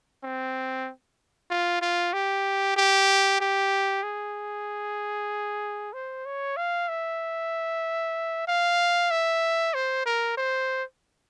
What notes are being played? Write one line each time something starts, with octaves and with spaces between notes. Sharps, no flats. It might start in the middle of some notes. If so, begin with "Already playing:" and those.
C4
F4
F4
G4
G4
G4
G#4
C5
C#5
F5
E5
F5
E5
C5
A#4
C5